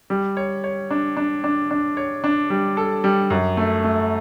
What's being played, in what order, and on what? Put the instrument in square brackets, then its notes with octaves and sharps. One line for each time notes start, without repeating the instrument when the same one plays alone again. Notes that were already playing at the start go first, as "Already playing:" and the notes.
[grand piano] G3
C#5
C#5
D4
D4
D4
D4
C#5
D4
G3
A4
G3
F#2
A3
A3